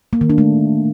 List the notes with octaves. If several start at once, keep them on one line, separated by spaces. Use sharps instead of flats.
A#3
D#3
D4
A3